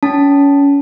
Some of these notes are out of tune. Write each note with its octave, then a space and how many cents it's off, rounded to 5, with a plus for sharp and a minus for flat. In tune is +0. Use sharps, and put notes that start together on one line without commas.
C#4 +25 A5 +0